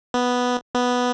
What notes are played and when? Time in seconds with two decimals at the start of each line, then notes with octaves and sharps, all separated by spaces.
0.14 B3
0.75 B3